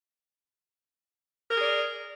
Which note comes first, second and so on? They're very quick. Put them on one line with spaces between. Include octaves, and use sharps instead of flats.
A#4 G#4 D5